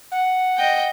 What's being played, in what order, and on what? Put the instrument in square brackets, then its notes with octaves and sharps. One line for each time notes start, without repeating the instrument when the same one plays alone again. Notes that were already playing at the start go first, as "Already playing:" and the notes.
[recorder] F#5
[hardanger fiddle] D#5 G5